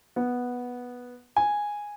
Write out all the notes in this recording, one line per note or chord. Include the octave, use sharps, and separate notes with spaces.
B3
G#5